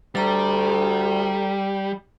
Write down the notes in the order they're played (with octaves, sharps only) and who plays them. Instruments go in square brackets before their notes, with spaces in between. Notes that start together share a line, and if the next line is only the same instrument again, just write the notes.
[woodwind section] D2 [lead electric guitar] G3 [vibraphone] A4 A#5